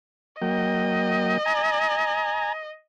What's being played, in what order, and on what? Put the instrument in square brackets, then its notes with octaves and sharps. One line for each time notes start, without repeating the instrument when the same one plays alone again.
[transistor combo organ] F#3 A#3 G5 [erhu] D#5
[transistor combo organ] G#5 A#5